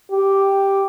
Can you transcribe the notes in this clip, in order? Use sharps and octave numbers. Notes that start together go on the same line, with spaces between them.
G4